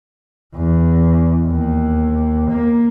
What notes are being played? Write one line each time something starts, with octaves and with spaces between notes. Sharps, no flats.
E2
D#2
A#3